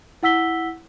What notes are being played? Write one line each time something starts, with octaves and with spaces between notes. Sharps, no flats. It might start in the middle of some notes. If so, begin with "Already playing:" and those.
E4 F#5 E6 B6 G7